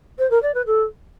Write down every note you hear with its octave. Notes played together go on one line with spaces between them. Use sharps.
C5
A#4
D5
B4
A4